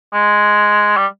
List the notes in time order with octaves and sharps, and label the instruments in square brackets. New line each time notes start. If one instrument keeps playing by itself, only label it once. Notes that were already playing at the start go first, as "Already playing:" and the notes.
[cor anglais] G#3
G3